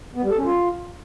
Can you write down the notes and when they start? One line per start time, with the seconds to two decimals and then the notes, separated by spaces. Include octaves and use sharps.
0.15 B3
0.23 G3
0.30 A4
0.37 C#4
0.45 F4